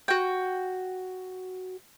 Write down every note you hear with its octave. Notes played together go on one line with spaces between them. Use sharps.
F#4 G5